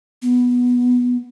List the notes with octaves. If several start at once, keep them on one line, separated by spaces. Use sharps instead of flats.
B3